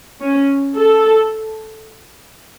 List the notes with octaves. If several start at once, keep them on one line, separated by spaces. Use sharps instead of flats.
C#4
A4